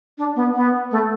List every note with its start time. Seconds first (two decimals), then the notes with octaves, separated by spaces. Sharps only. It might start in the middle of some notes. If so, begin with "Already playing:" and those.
0.18 D4
0.36 B3
0.55 B3
0.91 A3